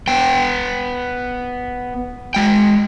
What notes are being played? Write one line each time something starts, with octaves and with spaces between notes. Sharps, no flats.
B3 G5
G#3 G5